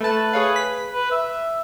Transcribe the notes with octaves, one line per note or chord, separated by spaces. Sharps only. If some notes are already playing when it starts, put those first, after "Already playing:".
A3 B4 A5
G#4 C#5 F5
B6
B4
E5